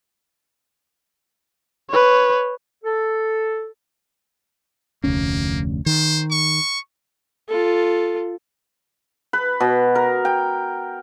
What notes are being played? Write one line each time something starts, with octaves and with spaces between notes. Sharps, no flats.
B4 C#5
A4
F1 D2 A#3 C#4
D#3 C5
C#6
F4 A4
B4
B2
A#4
G5